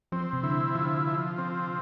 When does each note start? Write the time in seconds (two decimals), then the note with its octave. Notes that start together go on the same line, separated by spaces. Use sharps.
0.12 F3 C4
0.33 C3
0.43 D3 E4
0.75 D3 F3
1.07 F3
1.38 C4